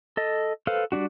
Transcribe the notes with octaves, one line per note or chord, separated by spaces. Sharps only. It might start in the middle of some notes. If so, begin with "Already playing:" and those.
A4 D#5
A4 B4 C5 F5 F6
G3 C4 D4 F#4